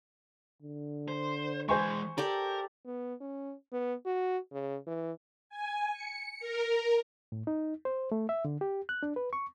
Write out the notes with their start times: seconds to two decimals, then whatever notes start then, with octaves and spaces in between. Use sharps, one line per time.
0.62 D3
1.08 C5
1.69 E3 G#3 C5 G#5 C#6
2.18 G4 A4 A#4 D5
2.86 B3
3.21 C#4
3.73 B3
4.06 F#4
4.52 C#3
4.87 E3
5.50 G#5
5.93 C#7
6.40 A#4
7.32 A2
7.47 D#4
7.85 C5
8.12 A3
8.29 E5
8.45 D3
8.61 G4
8.89 F#6
9.03 D4
9.16 B4
9.33 C#6